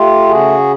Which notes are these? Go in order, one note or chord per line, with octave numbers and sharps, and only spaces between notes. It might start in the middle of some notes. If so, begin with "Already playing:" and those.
Already playing: A3 F4 G4
C#3 F#4 G#4